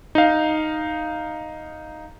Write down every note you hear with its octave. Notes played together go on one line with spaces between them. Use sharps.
D#4 F5